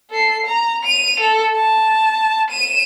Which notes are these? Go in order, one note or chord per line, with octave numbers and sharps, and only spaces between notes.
A4 C7
A#5
D#7 F7
A4
A5
D#7 E7